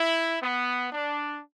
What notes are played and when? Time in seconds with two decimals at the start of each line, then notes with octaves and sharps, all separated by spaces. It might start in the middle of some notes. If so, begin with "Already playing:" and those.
Already playing: E4
0.41 B3
0.93 D4